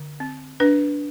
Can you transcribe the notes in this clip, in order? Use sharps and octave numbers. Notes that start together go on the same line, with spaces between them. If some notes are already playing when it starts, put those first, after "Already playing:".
Already playing: D3
C4
D4 B4